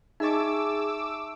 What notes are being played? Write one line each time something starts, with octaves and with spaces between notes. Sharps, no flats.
D#4 G#4 D#5 E5 A5 C#6 D6 E6